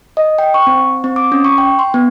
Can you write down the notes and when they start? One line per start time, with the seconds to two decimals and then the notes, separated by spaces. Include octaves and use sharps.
0.17 D#5
0.38 G5
0.54 C#6
0.67 C4
1.04 C4
1.16 D6
1.32 C#4
1.45 C#6
1.58 G5
1.79 C6
1.94 B3